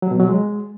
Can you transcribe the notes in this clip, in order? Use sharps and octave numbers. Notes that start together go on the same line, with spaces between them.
F#3
B2
F#3
G#3